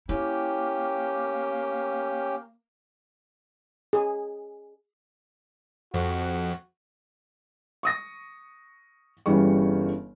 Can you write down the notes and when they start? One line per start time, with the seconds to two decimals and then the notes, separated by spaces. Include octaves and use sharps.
0.09 A#3 C#4 E4 G4 G5
3.93 G#4
5.94 F2 F#4
7.83 C#6 D#6 A#6
9.26 G1 C#3 E3 G3 C#6